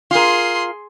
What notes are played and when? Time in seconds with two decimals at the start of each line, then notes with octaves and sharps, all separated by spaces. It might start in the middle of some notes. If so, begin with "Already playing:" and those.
0.11 F4 G#4 A#4 C6